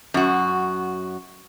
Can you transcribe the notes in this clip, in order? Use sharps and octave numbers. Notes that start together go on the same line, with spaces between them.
F#2 F#4